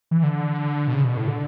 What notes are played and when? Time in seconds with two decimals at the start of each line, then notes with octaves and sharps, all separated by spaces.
0.11 E3
0.23 D3
0.88 B2
0.93 C#3
1.04 B2
1.17 A2
1.28 D3